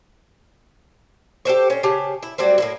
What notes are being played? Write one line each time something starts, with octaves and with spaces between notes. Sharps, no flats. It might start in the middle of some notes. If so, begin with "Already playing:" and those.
G4 A4 C5 C#5
C4 C#4
C#3 G4 G#4 A5
E4
F#3 G3 A3 C4
A2 A#3 E4